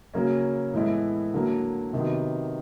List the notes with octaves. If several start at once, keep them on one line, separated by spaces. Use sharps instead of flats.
C#3 F#3 A#3 C#4
A2 E3 G#3 B3 E4
D3 F#3 A#3
C3 D#3 F#3 B3